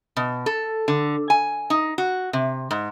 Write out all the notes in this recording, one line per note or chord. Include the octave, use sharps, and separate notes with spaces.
B2
A4
D3
G#5
D#4
F#4
C3
G#2